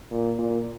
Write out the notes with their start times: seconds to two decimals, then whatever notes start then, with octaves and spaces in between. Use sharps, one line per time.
0.11 A#2
0.38 A#2